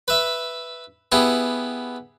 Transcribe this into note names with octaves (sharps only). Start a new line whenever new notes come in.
B4 E5
B3 E4 G4 G#4